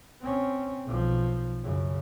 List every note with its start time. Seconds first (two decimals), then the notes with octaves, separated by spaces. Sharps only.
0.22 C4 C#4
0.85 B1 F3
1.64 F#2 C#3